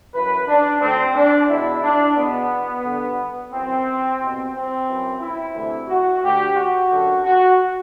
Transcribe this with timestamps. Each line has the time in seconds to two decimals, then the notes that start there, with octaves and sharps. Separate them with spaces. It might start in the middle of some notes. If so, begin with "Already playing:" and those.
0.14 F#2 E3 B4
0.48 D4
0.81 D2 D3 C4
1.15 D4
1.49 E2 B2 E4
1.82 D4
2.16 E2 B2 B3
2.84 G2 D3
3.52 F#2 E3 C4
4.20 C2 B2
4.54 C4
4.87 F#2 E3
5.21 E4
5.55 D2 C3 E3
5.88 F#4
6.22 D2 D3 G4
6.56 F#4
6.90 F#2 D3
7.24 F#4